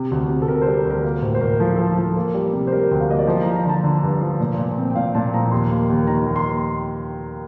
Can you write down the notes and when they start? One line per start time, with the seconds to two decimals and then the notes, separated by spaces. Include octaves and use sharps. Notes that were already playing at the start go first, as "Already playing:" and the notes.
Already playing: C3
0.11 D2
0.29 C3
0.42 A4
0.48 C3 A#4
0.62 C5
0.67 G3
0.75 A#4
0.85 D2
0.90 A#4
1.03 A#3 A#4
1.22 A2 C5
1.35 C5
1.41 A2 A#4
1.60 F3 A4
1.76 F3 A4
1.98 F3
2.17 A#3
2.34 G3
2.53 C3
2.67 C5
2.72 G3 A#4
2.91 D2 G5
3.00 F5
3.10 A#3 D#5
3.19 D5
3.27 F3 C5
3.42 F3 A#5
3.56 A#5
3.65 D3 A5
3.84 D3
4.03 G2
4.21 F3
4.40 A#2
4.58 A#2
4.78 C4
4.90 G5
4.95 A#2 F5
5.15 A#2 A5
5.34 F3 A#5
5.51 D#2 C6
5.70 A#3
5.90 D#2
6.07 D#3 A#5
6.26 D#2
6.36 C6